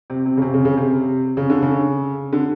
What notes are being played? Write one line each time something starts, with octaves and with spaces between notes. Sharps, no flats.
C3
C3
C#3
C3
C#3
C#3
C3
C#3
D3
C#3
D3